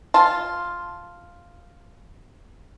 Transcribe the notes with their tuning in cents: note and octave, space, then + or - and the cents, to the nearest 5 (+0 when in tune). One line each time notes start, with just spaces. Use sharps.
F4 +0 A5 +0